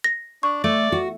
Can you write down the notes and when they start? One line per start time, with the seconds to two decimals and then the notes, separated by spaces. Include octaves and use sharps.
0.04 A#6
0.43 D4 C#6
0.64 A3 D5
0.92 F#4